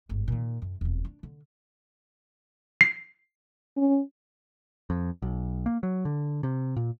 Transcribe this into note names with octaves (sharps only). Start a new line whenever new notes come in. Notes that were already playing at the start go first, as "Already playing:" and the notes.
G1 G#2
A#2 D#3
F#2
E1 F2
D4
D3
C7
C#4
F2
B1
A#3
F#3
D3
C3
A#2